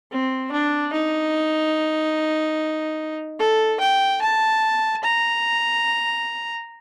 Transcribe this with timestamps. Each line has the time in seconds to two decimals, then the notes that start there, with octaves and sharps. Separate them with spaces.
0.11 C4
0.52 D4
0.93 D#4
3.39 A4
3.80 G5
4.22 A5
5.03 A#5